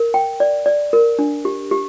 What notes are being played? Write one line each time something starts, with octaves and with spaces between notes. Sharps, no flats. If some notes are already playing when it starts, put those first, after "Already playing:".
Already playing: A#4
G5
D5
D5
A#4
D4
G4
G4